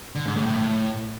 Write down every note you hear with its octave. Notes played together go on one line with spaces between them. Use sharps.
D3
G#2
A2
A2
A2